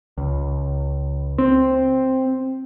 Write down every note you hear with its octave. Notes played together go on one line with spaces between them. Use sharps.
C#2
C4